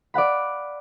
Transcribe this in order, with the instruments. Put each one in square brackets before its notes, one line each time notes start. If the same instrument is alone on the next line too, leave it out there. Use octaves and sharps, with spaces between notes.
[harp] D5 F5 F#5 B5